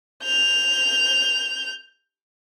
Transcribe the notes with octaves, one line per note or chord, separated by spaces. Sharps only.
G6 F7